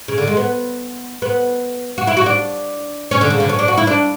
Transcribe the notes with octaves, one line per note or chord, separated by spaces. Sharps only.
C#3
D3
G#3
B3
B3
F#4
E4
F#4
D4
C#4
D3
C#3
D3
C#4
D4
F#4
E4
D4